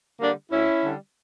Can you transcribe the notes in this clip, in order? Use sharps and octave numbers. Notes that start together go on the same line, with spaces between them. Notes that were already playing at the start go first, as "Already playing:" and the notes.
D3 G3 A#3 D4
D2 C#4 E4
D3 G3